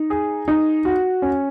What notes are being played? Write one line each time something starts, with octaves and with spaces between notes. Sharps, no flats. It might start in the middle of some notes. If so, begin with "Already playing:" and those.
Already playing: D#4
G#4
D#4
F#4
C#4